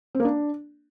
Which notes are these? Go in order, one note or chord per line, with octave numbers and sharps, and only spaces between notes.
C4
A#3
D4